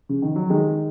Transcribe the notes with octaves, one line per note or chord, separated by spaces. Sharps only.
C#3
D#3
F#3
D#3 G#3